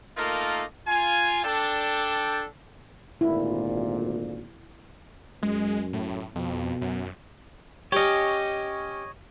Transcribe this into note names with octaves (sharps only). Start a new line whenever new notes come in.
A3 A#3 D#4 F4 A4 A#4
F4 G#5
D4 A4 G5
G#1 D2 A#2 E4
F#2 G#3
A2
F2 B2
F#2
C#4 G4 C#5 D#5